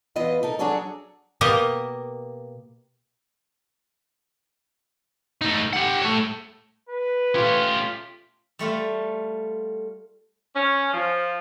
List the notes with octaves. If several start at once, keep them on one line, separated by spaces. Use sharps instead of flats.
E2 E3 F4 B4 D#5
D#4 A4 A#4
F#3 D4 F#4 G#4 A4 C#5
B2 A#3 G4 A#4 D#5
A3 D#4
G4 F#5
A3 C#5
B4
A3 C#4 F4 G4
G3 A3 F4 A4
C#4
F3